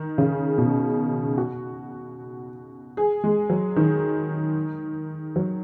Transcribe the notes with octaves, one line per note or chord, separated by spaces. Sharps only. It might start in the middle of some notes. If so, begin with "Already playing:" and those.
Already playing: D#3
C#3
B2
F#4
G#4
G#3
F#3
D#3
F#3